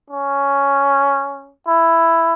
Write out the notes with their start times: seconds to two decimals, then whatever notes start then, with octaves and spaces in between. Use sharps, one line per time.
0.10 C#4
1.67 E4